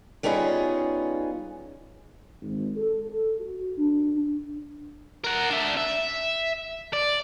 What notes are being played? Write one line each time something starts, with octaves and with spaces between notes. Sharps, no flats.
G3 B3 C#4 D#4 F4 G#4
G#1
A4
A4
F#4
D4
A#4 F#5
D4 E5
E5
D5